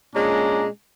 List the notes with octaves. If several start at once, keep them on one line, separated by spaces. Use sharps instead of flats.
A#2 G#3 C#4 D4 A#5